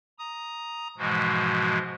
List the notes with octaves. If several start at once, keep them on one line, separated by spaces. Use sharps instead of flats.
A#5 D#6
G#2 B2 E3 F3 G#3 F#4